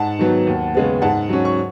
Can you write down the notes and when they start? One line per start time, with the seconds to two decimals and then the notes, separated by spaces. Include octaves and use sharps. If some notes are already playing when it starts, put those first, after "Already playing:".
Already playing: G#2 F#5 A5
0.19 D#3 F#3 B3
0.47 D#2
0.75 C#3 G#3 B3
1.02 G#2 F#5 A5
1.29 F#3 C#4
1.45 C#6